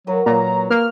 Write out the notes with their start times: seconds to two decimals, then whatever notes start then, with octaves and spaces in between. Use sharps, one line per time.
0.07 F#3 F#4 A#4 B4
0.26 A#2 F#3 A#5
0.70 A#3 F6